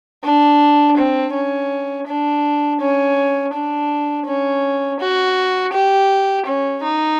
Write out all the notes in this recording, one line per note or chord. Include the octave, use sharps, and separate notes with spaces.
D4
C4
C#4
D4
C#4
D4
C#4
F#4
G4
C#4
D#4